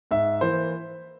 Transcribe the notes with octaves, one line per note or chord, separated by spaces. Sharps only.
G#2 E5
E3 A#3 C5